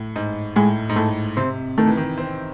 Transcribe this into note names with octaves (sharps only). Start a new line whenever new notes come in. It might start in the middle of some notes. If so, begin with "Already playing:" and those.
Already playing: A2
G#2
A2 G#3
G#2
A2 A3
C3 C4
D#3 A3
E3
D#3
C4